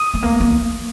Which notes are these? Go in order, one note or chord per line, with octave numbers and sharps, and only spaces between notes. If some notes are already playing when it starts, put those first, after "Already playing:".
Already playing: D#6
A3
A#3
A#3